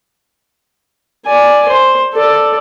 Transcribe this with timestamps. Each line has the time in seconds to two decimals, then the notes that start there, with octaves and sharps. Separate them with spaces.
1.27 D5 G#5
1.69 C5
2.14 A4 D5